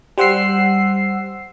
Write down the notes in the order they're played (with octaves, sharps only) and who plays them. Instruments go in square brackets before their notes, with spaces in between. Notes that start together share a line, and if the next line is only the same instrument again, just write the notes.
[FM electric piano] G3 C5 F#5 E6 C7